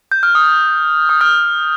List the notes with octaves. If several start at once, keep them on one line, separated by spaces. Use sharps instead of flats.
G6
F6
D#6
D#6
F6